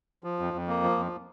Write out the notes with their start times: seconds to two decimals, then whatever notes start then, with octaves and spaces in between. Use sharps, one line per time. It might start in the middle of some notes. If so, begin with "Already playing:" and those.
0.24 F3
0.39 F2
0.54 F2
0.68 A#3
0.83 F3
0.97 F2